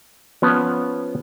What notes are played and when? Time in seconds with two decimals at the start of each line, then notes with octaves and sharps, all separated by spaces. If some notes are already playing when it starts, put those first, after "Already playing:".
0.42 F3 B3 C#4